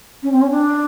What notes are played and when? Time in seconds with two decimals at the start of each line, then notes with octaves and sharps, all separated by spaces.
0.23 C#4
0.32 C4
0.42 C#4
0.51 D4